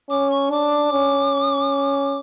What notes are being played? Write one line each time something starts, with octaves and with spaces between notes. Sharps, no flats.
C#4 D6
C#6
D4 D6
C#4